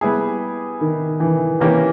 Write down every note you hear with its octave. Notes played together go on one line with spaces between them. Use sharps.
G3 B3 E4 G#4
D#3
E3
D#3 E3 A#3 C#4 G4